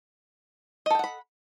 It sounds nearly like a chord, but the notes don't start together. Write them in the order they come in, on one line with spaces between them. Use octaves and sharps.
D#5 A4 G5 F#5 B5